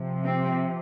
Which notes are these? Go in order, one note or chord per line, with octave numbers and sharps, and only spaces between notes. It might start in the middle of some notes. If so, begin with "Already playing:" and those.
Already playing: C3 F3
C4